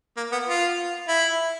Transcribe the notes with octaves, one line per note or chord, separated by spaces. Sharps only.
A#3
B3
F4
E4